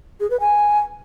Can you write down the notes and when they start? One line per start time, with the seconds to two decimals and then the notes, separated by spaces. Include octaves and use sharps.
0.20 G#4
0.30 B4
0.40 G#5